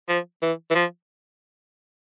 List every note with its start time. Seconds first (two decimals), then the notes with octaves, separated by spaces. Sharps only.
0.09 F3
0.42 E3
0.71 E3
0.75 F3